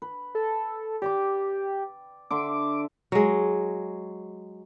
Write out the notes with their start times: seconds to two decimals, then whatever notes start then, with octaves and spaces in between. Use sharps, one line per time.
0.02 B4
0.35 A4
1.02 G4 D5 G5 D6
2.30 D3 E5 C6 D6
3.12 F#3 G#3